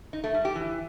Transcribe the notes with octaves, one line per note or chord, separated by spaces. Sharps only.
D#4
A3
G3
G4
E3